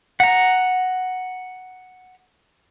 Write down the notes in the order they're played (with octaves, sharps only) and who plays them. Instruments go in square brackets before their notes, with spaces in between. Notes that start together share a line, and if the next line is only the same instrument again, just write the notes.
[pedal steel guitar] F#5 A#5